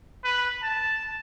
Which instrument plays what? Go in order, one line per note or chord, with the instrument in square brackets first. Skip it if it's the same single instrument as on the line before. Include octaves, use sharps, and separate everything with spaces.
[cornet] B4
A5